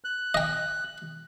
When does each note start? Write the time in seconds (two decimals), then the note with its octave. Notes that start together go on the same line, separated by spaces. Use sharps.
0.04 F#6
0.34 D#5 G5